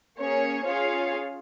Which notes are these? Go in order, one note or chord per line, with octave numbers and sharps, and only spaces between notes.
A#3 C#4 G#4 C#5
C#4 F4 G#4 C#5 F5